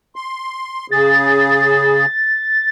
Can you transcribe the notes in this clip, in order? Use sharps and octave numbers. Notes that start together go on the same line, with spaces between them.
C6
C#3 G#4 A6